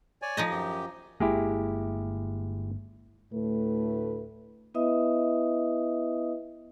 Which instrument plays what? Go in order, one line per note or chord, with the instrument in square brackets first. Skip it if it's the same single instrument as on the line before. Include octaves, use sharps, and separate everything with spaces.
[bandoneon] C#5 D5 G#5
[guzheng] F3 D#4 D#5
[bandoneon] F#2 G4
[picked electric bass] G1 G#3 A#3 [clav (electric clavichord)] E4 G4 G#4
[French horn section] D2 A2 A3 B4
[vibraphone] B3 E4 B4 D#5 E5 D#6